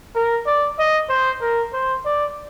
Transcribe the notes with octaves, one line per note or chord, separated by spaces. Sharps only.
A#4
D5
D#5
C5
A#4
C5
D5